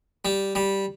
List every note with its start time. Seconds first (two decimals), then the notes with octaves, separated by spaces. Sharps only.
0.25 G3
0.55 G3